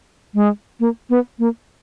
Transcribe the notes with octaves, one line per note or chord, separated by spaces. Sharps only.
G#3
A#3
B3
A#3